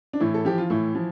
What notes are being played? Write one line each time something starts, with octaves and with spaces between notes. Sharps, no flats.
D4
A2 E3 E4
A4
F3 G4
F4
A2 E3 E4
F3